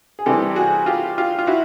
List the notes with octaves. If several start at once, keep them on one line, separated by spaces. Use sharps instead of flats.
G#4
C3 E3 G3 G4 A4
F#4 G#4
F4 G4
F4 G4
F4
E4 F#4